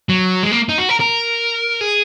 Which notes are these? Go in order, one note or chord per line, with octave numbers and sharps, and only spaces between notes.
F#3
G#3
A#3
D#4
F#4
A#4
A#4
G#4